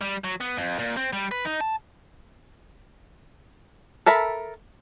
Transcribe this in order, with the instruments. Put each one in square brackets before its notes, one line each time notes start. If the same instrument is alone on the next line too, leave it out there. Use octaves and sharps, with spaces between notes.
[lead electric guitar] G3
F#3
B3
F2
A#2
C4
G3
B4
D#4
A5
[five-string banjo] A4 A#4 E5 A5 B5